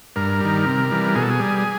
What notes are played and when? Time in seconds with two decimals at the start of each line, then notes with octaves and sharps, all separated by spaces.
0.16 G2 A#4
0.41 D#3 G3
0.66 C3
0.91 E3 G3
1.15 B2 G#4
1.22 A4
1.30 G#4
1.39 G3